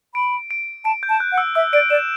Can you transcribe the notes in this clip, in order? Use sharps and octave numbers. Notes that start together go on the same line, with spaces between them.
B5 D7
D7
A5 D7
G6
A5
F#6
F#5
E6
E5 E6
D5 D7
D5 E7